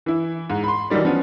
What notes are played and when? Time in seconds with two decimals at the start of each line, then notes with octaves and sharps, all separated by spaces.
0.06 E3 E4
0.50 G#2
0.64 B5 C6
0.90 D#3 E3 F#3 G3 D5
1.05 F3 B3 C#4